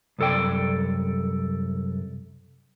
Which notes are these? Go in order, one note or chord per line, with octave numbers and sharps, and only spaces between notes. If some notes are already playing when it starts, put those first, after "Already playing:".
C2 F#2 A4 D5 G5